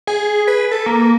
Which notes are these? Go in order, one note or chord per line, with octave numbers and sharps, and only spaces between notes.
G#4
B4
A4
A#3